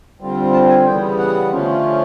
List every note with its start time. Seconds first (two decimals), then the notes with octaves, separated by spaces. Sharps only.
0.20 D3 G3 C4 F4
0.53 A5
0.69 G#5
0.85 C#3 E3 G3 B3 G5
1.18 F#5
1.50 D3 F3 A3 C#4 F4